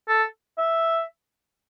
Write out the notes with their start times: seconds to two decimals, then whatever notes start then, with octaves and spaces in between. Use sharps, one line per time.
0.08 A4
0.58 E5